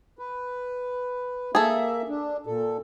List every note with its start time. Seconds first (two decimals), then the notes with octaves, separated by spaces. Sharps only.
0.19 B4
1.55 A#3 G#4 A4 E5
2.09 D4
2.47 A#2 A4